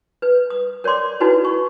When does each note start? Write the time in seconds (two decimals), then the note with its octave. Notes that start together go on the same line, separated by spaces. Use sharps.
0.22 B4
0.50 D#6
0.84 A#4 C#5 D5 C6 D6
1.20 D#4 E4 F#4 A4 B4 C#5
1.45 C#6